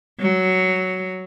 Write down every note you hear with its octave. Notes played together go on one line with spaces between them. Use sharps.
F#3